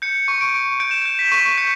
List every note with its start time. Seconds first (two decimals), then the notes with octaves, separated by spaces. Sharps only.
0.02 G6 C#7
0.28 C#6
0.41 D7
0.54 C#6
0.80 G6 D7
0.91 E7
1.02 G6 D7
1.19 B6
1.32 C#6
1.57 G6 C#7